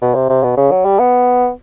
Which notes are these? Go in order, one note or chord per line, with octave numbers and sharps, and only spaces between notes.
B2
C3
C3
B2
C#3
F#3
G3
B3